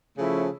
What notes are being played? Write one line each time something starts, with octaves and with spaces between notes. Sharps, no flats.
C#3 F3 A3 C#4 E4